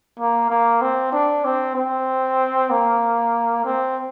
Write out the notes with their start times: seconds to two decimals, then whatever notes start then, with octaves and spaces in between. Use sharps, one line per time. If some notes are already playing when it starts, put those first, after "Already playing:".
0.19 A#3
0.50 A#3
0.82 C4
1.12 D4
1.45 C4
1.75 C4
2.70 A#3
3.65 C4